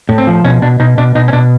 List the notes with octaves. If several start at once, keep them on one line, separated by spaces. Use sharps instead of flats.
A2
C4
F3
B2 C#4
B2 D4
B2 D#4
B2 D4
B2 D#4
C#4
B2 D4